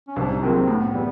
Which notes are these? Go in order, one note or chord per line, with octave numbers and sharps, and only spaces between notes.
C#4
C2 D4
D#4
C3 D#3 F#3 A#3 F4
C4
A2 B3
E3 G3